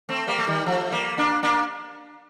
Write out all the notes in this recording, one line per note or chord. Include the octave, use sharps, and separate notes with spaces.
A3 C4
G3 A#3
A3
D#3 G3
F3 A3
G3 A#3
A#3 D4
A#3 D4